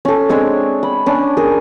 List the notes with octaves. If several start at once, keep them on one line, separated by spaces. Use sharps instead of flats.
C#4 A4
G#3 C4 D4 C#5
B5
C#4 D4
G#4 A#4